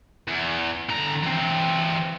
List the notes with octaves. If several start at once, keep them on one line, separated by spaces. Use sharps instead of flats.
E2
D3 A#5
E3 C4